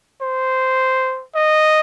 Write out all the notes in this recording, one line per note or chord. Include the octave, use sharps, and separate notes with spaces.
C5
D#5